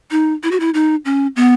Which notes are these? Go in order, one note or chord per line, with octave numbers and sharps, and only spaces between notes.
D#4
E4
F#4
E4
D#4
C#4
B3